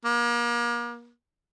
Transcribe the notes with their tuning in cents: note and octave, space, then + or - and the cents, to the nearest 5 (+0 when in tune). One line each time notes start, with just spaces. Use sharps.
A#3 +35